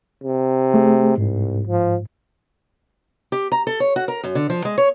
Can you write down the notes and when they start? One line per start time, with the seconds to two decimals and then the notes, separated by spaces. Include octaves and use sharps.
0.24 C3
0.74 A3 G#4
1.18 C2 G#2
1.67 F3
3.32 G4
3.52 A#5
3.67 A4
3.80 C#5
3.96 F#4
4.08 A#4
4.23 F#2
4.35 D3
4.50 F3
4.65 G#3
4.78 C#5